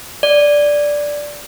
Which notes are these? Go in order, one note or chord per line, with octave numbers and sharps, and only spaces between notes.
D5